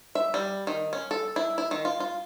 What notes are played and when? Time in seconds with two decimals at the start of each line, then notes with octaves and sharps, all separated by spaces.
0.15 E5
0.34 G3
0.67 D#3
0.93 C#4
1.11 A4
1.36 E4
1.58 E4
1.71 D#3
1.85 F4
2.00 F4